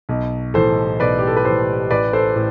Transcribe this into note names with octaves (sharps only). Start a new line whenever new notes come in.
B1
A2 E3 A4 C5
B1 B4 D5
G4
A4
B4
A2 E3 A4 C5
A1 B4 D5
A4 C5
A2